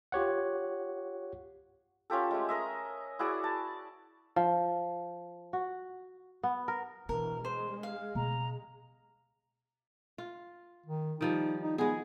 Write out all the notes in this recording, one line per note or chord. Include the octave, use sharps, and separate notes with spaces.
F4 G4 C#5 F#5
C#4 F4 G4 A4
G#3 A3
A#4 D#5 E5
E4 F#4 G#4 D5
A5
F3
F#4
B3
A#4
B2 E3 D4 A#4
G#3 C5
F5
B2 A#5
F4
D#3
D#3 F3 G3 D#4
D#4
G#3 B3 G#4